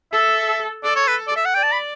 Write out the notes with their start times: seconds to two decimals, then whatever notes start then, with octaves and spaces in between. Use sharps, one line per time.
0.12 A4 E5
0.84 A4 D5
0.96 C#5
1.07 B4
1.28 D5
1.36 E5
1.45 F#5
1.54 D5 G5
1.63 A5
1.72 B5